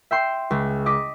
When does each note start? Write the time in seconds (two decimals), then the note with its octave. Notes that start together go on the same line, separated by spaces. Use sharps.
0.11 E5 G5 C6
0.51 C#2
0.86 D#5 D6 B6